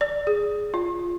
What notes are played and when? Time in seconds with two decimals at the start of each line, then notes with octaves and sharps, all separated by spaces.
0.01 D5
0.27 G#4
0.74 F4